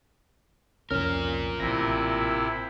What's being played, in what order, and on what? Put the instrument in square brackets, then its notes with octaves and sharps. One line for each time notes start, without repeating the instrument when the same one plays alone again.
[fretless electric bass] C2 F2 [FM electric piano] C#4 F6 [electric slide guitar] F4 A#4
[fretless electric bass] A1 [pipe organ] C3 E4 [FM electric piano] A#6